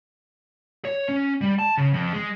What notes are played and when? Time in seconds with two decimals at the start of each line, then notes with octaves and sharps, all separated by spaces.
0.85 C#5
1.09 C#4
1.41 G3
1.59 A5
1.77 C#3
1.93 F2
2.13 G#3